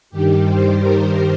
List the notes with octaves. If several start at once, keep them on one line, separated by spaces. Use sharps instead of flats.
G2 D#3 G3 G4
C5
A#4